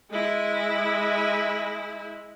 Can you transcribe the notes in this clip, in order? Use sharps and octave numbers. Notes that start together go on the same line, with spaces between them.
G#3 E4